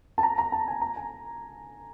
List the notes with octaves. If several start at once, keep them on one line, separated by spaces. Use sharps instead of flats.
A5
A#5
A#5
A5
G#5
A#5
G#5